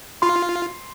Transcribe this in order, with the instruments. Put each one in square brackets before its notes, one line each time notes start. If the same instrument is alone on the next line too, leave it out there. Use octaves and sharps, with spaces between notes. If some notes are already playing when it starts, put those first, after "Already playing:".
[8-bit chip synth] F4 [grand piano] C6